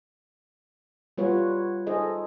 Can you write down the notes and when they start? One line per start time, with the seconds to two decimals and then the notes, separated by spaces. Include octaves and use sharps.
1.18 G3 B3 F4 F#4 B4 C#5
1.87 D#4 G#4 A4 C5 D#5